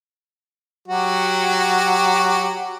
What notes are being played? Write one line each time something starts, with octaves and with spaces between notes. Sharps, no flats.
F#3 F#4 G4